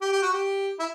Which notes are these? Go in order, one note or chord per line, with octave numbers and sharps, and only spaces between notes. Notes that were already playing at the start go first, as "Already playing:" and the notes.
G4
G4
F#4
G4
E4